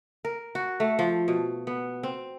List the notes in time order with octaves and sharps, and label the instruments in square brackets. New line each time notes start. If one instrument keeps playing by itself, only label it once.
[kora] A#4
F#4
A3
F3
B2
B3
C4